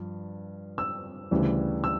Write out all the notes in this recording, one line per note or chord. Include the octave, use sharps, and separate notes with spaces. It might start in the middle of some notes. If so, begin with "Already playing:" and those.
Already playing: G2 F3
E6
D2 C#3 E3 G3
E6